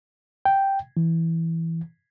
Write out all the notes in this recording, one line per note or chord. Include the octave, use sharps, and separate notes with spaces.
G5
E3